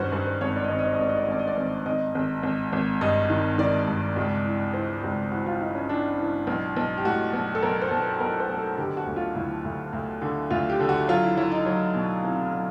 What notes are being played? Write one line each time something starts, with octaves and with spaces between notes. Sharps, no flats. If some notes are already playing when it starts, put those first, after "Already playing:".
Already playing: G2 D#3 C#4 F#4 B4 C5
G2 C5
C5
G#1 C#5
D5
D#5
G#1 D5
D#5
D5
D#5
G#1 D5
D#5
D5
D#5
G#1 D5
D#5
D5
G#1
G#1 D#5
G#1
G#1
G#1
G2 D#5
D#3
D#3 D5
G2
C#2
E3
E3 C5
C#2
E3 F#4
F4
E3 D#4
C#4
E3 D4
E3
B1
B1
G4
A2 F#4
B1
A4
B1 A#4
C5
B1
B4
B1 A#4
C5
B1
A4
D3 G4
F#4
D2
F4
D2 E4
D2
D2
D3
D2 F4
G4
D3
F#4
F#3 F4
E4
F#3 E4
D#4
F#3
B2
C2
F#3